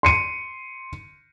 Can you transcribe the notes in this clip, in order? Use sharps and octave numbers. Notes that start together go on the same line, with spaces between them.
C6 C#7 D#7